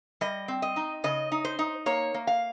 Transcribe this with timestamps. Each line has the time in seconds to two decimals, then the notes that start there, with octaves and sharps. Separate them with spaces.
0.21 G3 D#5
0.48 C4
0.62 D#5
0.76 D#4
1.04 C#3 D#5
1.32 D#4
1.45 C5
1.59 D#4
1.86 A#3 C#5
2.14 A#3
2.27 F5